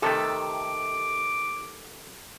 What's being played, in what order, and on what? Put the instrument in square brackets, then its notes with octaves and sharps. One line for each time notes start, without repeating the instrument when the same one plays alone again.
[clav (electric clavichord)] C3 D#3 A3 [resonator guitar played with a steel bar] A4 [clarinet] D6